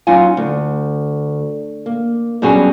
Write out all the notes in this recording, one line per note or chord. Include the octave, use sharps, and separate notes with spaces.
F#3 C#4 D#4 F4 F#5 G#5
D2
A#3
G2 B2 F#3 C#4 F#4 G#4